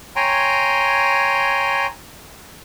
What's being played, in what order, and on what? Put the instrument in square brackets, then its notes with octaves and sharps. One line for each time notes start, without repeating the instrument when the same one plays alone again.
[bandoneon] C#5 G5 G#5 A#5 C6